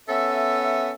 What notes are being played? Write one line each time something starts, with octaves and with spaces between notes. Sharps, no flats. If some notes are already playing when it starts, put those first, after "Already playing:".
B3 C#4 A4 E5